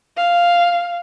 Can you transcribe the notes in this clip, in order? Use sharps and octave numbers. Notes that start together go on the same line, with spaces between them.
F5